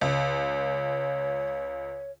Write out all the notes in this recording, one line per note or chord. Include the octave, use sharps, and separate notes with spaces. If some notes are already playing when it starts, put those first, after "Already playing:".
C#2 C#5